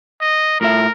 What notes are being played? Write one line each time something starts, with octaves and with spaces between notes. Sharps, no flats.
D#5
A2 F4 A#4 E5